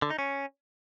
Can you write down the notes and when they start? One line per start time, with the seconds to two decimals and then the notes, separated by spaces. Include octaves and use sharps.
0.02 D3
0.10 D#4
0.19 C#4